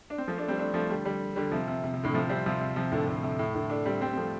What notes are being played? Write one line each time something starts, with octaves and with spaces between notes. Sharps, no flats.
D4
C4
F3 A3
A3 D4
G3 C4
A3 D4
F3 A3
D3 G3
D3 G3
D3 G3
C3 F3
C3
C3
C3
A2 D3
C3 F3
G3 C4
C3 F3
C3
C3 F3
A2 D3
A2 D3
C3
A2
A2 D3
A3 D4
G3 C4
G3 C4
C4
F3 A3